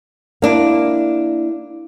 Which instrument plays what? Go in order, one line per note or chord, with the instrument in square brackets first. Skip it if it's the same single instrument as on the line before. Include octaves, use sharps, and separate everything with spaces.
[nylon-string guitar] A#3 D4 E4